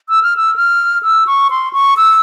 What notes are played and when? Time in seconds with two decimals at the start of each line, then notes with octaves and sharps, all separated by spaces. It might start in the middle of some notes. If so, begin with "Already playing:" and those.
0.09 E6
0.23 F6
0.37 E6
0.56 F6
1.03 E6
1.27 C#6
1.50 C6
1.73 C#6
1.97 E6